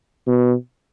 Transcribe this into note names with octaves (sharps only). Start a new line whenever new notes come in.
B2